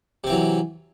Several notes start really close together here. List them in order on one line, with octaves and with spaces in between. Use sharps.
C3 C4 E3 F#3